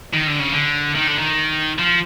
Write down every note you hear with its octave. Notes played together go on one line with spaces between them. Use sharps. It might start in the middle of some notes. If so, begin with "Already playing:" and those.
D#3
D3
C#3
D3
D#3
D3
D#3
F3